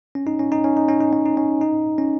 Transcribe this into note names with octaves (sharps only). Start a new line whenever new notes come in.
C#4
D#4
C#4
D#4
C#4
D#4
C#4
D#4
C#4
D#4
C#4
D#4
C#4